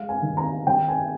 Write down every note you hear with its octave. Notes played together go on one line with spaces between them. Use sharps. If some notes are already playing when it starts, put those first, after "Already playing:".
Already playing: G#3 F5
G#5
D#3
A#5
D#3 G5
G#5